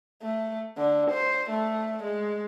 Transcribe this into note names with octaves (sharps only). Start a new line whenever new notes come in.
A3
D3
C5
A3
G#3